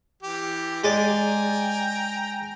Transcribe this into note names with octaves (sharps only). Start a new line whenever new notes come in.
E3 G4
G#3 D5 G5 G#5 A#5